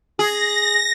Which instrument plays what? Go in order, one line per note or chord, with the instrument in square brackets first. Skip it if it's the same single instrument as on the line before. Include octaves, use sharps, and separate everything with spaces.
[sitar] G#4 [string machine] A#6